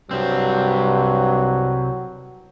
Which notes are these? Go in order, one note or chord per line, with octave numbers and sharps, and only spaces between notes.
C2 G2 F#3 C4